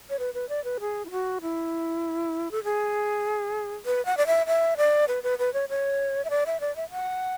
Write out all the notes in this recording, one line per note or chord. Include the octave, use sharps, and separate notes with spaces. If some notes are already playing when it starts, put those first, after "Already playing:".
C#5
B4
B4
D5
B4
G#4
E4
F#4
E4
A4
G#4
B4
F#5
D5
E5
E5
D5
B4
B4
B4
C#5
C#5
E5
D5
E5
D5
E5
F#5